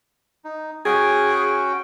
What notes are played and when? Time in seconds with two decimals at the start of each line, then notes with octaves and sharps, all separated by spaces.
0.45 D#4
0.85 C#4 F#4 G#4 G5